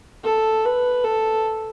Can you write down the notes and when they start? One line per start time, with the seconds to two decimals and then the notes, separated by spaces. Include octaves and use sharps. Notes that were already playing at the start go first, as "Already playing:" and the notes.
0.24 A4
0.65 B4
1.04 A4